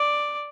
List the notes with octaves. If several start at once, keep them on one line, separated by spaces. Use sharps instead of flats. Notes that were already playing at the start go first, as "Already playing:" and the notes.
Already playing: D5